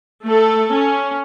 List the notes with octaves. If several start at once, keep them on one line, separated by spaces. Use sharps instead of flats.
A3 A4
C#4